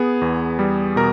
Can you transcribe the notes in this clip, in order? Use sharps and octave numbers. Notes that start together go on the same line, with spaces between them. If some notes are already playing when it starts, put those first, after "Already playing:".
Already playing: B3 G#4
E2
G3
B2 A#4 A#5